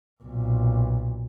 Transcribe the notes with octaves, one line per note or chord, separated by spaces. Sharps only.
B1 A#2